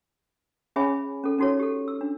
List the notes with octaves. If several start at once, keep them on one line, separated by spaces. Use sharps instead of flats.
C#4 G#4 C#5 E5 G#5 B5
C#4 A4
C#4 D#4 F#4 A4 C#5
G4 A4
E6
D4